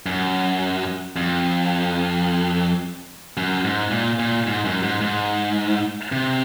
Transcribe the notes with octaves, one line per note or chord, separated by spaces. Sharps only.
F#2
F2
F#2
G#2
A#2
A#2
G#2
F#2
G#2
G#2
C3